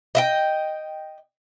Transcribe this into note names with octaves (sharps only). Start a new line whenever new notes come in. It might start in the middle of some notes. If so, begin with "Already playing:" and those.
D#5 E5 G5